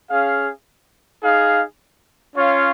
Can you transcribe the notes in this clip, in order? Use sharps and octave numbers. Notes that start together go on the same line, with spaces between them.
C#4 G#4 F5
D#4 G#4 F5
C#4 F4 C#5 F5